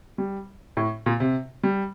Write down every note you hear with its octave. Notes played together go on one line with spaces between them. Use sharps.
G3
A2
A#2
C3
G3